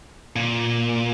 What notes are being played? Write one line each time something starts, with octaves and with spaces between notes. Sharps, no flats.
A#2